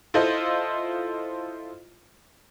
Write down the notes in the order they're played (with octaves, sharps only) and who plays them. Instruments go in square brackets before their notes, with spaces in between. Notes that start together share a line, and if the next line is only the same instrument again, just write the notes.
[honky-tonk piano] E4 F4 A4 C5 D#5